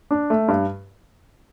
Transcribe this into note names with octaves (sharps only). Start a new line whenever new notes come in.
D4
A3
G2